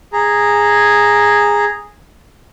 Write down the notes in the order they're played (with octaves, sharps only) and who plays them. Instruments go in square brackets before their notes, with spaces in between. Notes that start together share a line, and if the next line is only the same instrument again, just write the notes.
[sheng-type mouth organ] G#4 A#5